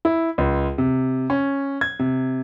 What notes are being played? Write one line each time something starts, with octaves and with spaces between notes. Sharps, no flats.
E4
C#2
C3
C#4
G#6
C3